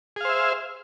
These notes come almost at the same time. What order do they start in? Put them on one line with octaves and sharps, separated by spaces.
G#4 F5 C5 E5